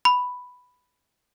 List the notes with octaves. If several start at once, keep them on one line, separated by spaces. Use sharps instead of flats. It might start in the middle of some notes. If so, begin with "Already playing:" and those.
B5